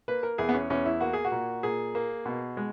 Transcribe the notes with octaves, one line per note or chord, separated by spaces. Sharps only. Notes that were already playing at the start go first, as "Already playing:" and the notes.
A#3 B4
A#4
E2 G#4
B3
C#4
E2 C#4
E4
A#3 F#4
G#4
F#4
A#2
A#2 G#4
A#3
B2
G#3